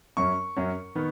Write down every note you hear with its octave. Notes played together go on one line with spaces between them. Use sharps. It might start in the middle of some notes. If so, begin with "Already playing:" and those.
F#2 F#3 C#4 C#6
F#2 F#3 C#4
D#3 B3